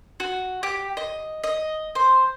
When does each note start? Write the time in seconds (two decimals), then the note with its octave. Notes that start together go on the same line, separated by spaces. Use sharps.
0.20 F#4
0.63 G4
0.97 D#5
1.44 D#5
1.95 C5